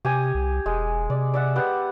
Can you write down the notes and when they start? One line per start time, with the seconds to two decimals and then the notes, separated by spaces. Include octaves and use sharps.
0.05 C3 G4 G#5 D#6
0.35 C2
0.66 E1 G#3
1.10 C3 D5
1.34 D5 E5 F#5
1.55 B3 G4 F#5